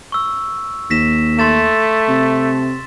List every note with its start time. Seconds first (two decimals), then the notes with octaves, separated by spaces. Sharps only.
0.12 C#6 E6
0.90 D#2 A#6 B6 E7
1.39 A3 C6 A6 E7
2.08 C3